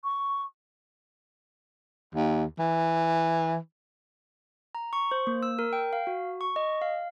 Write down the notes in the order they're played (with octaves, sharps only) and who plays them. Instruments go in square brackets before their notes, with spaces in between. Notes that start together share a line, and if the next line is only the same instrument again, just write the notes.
[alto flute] C#6
[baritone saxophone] D#2
E3
[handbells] A#5
C#6
C5
A#3
E6
A#4
G5
F5
F#4
C#6
D#5
F5